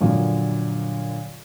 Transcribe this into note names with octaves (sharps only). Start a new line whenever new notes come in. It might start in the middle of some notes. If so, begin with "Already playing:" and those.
F#2 A#2 D3 F3 F#3